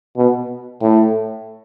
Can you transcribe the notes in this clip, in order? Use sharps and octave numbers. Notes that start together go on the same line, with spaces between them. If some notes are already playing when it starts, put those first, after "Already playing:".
B2
A2